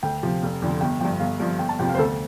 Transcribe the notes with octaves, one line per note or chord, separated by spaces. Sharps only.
D2 G5
C3 F3
F1
F2 D3 F3
G1 G5
G2 F3 G5
G1 F5
G2 F3
G1 G5
A5
F2 C3 F3 G5
F5
C5
D2 A4